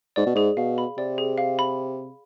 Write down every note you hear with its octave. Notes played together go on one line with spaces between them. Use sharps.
G#2 D5
B2
G#2 G#4
B2 F5
B5
C3 D5
G#4
F5
B5